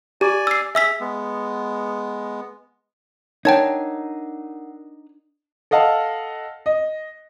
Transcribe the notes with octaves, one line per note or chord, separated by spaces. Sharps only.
G4 D5 G#5
E6 C7
G#4 E5 E6 B6
G#3 B3
D4 D#4 A#4 C#5 F#5 G5 A5 G#6
A4 D#5 F5 F#5 A5
D#5